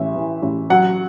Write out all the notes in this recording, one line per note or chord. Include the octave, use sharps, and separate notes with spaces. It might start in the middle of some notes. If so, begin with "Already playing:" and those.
Already playing: A1 E3 E5
E3
A1
F#3 F#5